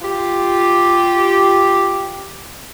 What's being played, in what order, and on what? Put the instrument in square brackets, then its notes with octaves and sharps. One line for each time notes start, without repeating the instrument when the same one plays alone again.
[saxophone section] F4 G4